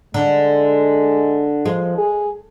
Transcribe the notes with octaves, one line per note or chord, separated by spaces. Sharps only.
D3 G#3
F3 G#3
G#4